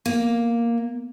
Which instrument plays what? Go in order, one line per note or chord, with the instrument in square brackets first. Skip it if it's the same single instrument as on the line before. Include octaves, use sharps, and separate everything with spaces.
[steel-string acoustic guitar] A#3